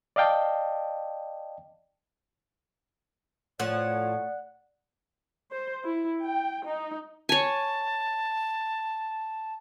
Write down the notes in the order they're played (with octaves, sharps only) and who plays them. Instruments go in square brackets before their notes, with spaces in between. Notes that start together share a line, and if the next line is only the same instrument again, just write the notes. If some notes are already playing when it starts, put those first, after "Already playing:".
[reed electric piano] D5 D#5 F5 G5 A5
[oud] A2 F3 [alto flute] C#5 [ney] D5 [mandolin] F#5
[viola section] C5
E4
G5
D#4
[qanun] C#5 G#5 [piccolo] A5